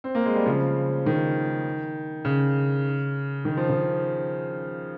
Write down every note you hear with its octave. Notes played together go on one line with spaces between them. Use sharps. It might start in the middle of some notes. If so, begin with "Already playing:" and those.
C4
A#3
G#3
G3
C#3 F3
D#3
C#3
D#3
F3
D#3